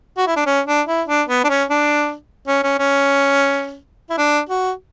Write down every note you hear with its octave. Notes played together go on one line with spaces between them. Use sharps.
F#4
E4
D4
C#4
D4
E4
D4
B3
D4
C#4
D4
C#4
C#4
C#4
E4
D4
F#4